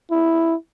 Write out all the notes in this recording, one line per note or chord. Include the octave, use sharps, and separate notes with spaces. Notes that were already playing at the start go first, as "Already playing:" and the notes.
E4